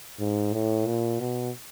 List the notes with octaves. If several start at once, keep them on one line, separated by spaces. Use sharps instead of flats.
G#2
A2
A#2
B2